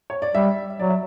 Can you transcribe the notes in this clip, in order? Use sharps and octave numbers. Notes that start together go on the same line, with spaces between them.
C#5
D5
G3 E5
F#3 D5
E5